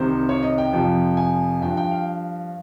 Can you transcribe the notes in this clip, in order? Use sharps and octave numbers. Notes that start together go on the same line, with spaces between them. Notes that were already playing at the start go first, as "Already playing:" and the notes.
Already playing: C2 C3 D#3 C5
C#5
D#5
G5
F2 C3 F3
G#5
G2 F3 G5
G5
F5